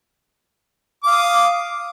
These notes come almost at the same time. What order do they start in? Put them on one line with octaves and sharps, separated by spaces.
D6 F5 D#6